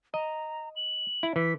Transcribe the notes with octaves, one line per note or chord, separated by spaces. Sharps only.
D#5 A#5
F#7
E4
E3 B6